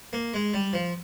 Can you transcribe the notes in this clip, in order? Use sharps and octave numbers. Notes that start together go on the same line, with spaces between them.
A#3
G#3
G3
F3